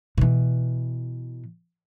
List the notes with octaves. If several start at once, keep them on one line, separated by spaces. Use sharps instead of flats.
B2 E3